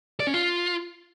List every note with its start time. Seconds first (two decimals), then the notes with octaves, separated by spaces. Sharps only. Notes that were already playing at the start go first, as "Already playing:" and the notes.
0.20 D5
0.27 C#4
0.34 F4